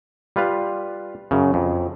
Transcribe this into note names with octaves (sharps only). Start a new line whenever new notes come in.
G3 F4 B4 F5
F#2 C#3
F2